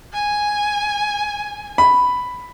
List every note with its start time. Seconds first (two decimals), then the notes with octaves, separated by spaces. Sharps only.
0.13 G#5
1.78 B5